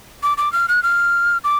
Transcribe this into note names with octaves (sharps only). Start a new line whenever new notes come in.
D6
D6
F6
F#6
F6
D6